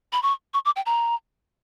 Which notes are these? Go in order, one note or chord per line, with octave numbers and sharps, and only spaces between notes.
B5
C#6
C#6
D6
G5
A#5